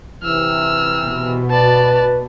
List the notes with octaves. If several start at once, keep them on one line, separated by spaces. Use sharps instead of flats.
C3 E3 E6 F6
B2
B4 D5 A5